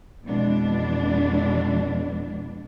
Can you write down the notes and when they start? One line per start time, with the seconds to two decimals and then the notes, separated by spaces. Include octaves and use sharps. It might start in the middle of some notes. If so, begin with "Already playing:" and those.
0.25 F2 B2 E3 G#3 D4